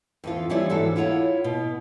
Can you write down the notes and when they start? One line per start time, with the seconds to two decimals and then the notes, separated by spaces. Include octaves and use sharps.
0.24 F2 E3 F4
0.50 E3 F3 G3 E4 C#5 D5
0.70 G#2 E3 D4 F#4 A4
0.96 E4 F4 C#5 F#5
1.44 B2